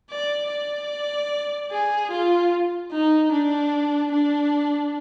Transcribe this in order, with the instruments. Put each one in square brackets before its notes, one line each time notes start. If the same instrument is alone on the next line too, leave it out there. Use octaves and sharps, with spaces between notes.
[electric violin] D5
D5
G#4
F4
D#4
D4
D4